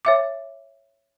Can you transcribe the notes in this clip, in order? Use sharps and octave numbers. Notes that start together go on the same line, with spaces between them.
C#5 E5 D6